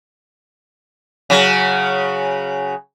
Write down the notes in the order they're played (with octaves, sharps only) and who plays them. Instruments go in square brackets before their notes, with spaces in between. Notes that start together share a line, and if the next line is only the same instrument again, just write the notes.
[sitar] C#3 F#3